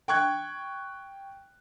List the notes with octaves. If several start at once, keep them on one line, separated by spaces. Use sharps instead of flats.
G5 C#6 F#6 G#6